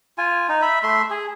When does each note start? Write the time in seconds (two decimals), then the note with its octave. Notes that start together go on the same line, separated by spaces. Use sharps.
0.18 F4 G#5
0.49 D#4
0.62 E5 B5
0.83 A3 E5 C6
1.10 G#4